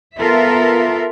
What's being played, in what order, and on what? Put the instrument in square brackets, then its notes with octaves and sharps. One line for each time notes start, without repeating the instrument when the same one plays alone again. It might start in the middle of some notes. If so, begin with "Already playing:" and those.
[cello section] B3 F4 A4 A#4 E5